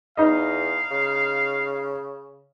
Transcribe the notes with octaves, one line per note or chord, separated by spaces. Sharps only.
E2 D#4 D#5 F5
C#3